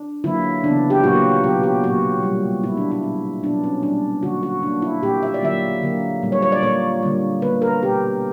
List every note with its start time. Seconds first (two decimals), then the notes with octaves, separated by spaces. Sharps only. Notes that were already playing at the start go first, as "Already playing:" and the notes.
Already playing: D4
0.24 D3 F#3 A#3 E4
0.63 C#3 E3 B3 D4
0.90 G4
1.04 A#2 F#3 A#3 F#4
1.44 B2 F#3 B3 G4
1.63 G4
1.84 A#2 F#3 A#3 F#4
2.23 B2 G3 A#3
2.63 A#2 F#3 A#3 E4
2.77 D4
2.91 E4
3.03 A#2 F#3 B3
3.43 B2 F#3 B3 D4
3.64 C#4
3.83 A#2 G3 A#3 D4
4.23 D3 F#3 A#3 F#4
4.43 F#4
4.63 D3 A#3 D4
4.82 E4
5.03 A#2 A#3 G4
5.23 E5
5.34 D5
5.43 D3 F#3 A#3 E5
5.82 D3 F#3 A#3
6.22 A#2 G3 A#3
6.32 C#5
6.42 C#5
6.52 D5
6.62 A#2 A#3 C#5
7.03 D3 G3 A#3
7.42 D3 A#3 B4
7.62 A#4
7.82 B2 A#3 G4